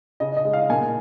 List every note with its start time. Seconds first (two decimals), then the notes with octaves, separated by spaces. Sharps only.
0.20 C#3 D#5
0.37 D#5
0.45 G#3
0.53 F5
0.70 A#2 G#5